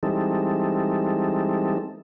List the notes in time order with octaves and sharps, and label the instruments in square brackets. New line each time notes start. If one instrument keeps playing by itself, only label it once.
[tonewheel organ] E3 G3 G#3 C4 D#4 A4